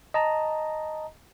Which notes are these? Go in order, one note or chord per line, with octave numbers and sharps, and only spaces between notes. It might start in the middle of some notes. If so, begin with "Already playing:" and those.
D#5 A5 A#5